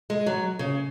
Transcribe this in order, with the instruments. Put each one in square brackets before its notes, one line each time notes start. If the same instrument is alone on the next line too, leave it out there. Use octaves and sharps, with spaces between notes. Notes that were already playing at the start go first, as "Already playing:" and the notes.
[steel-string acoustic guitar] G#3
F#3
C#3